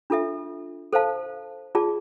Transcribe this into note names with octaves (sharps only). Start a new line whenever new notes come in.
D4 F4 A4 E5
A4 C5 F5 A5
F4 G#4 D5 A5